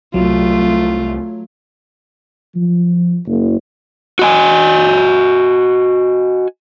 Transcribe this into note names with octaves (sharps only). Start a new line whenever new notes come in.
C2 F#3 A3 F4
F3
F#1
F#4 D#5 G#5